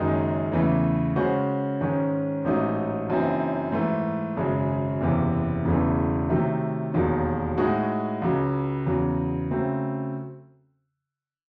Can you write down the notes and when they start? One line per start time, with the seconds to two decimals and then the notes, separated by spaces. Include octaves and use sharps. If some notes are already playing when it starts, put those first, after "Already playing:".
Already playing: F#1 F#2 D#3 G#3 D#4
0.52 E2 C#3 E3 A3
1.16 C#3 G#3 C#4 F#4 C5
1.81 G#2 D#3 G#3 C#4
2.45 A1 G#2 F#3 A3 D#4
3.09 F#1 F#2 E3 C4 D#4
3.72 G#2 E3 A3
4.36 G#1 F#2 C#3 G#3
5.01 F#1 E2 C3 E3
5.65 E1 E2 C#3 E3 A3
6.30 C3 D#3 F#3 A3
6.94 E1 D#2 D#3 F#3
7.57 A2 G#3 D#4 F#4
8.22 C#2 C#3 F#3
8.86 E2 C#3 F#3
9.51 C#3 F#3 A3 C4